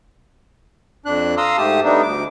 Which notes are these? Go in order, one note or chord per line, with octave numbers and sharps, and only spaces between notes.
F2 D4 F#6
F5 A#5 C6 D#6 E6
G#2 A3 G4 A5 D#6
G3 A3 B3 D4 D#4
D2 D6